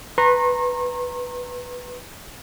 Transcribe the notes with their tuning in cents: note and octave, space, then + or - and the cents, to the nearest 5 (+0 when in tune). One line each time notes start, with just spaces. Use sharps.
B4 +0 A#5 -10 C#6 -45